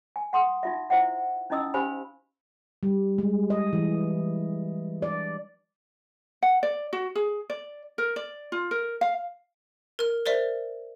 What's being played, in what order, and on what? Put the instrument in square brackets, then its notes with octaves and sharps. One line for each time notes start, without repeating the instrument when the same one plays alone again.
[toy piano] G#5
F#5 C6 D#6
D#4 F4 E5
E4 C5 E5 F#5
C#4 D#4 E4 D#5 D#6 E6
C#4 G4 C5 F5 G#5 B5
[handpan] G3
G#3
D#5
E3
D5
[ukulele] F#5
D5
F#4
G#4
D5
A#4
D5
F4
A#4
F5
[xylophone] A#4 F6
A#4 C5 D5 E5